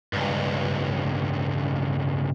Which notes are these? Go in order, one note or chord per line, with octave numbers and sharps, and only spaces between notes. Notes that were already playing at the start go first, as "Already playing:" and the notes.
C#2 G2